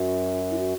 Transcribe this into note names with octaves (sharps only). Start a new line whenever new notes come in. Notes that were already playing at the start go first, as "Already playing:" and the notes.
Already playing: F#2 F#4
E4
F#4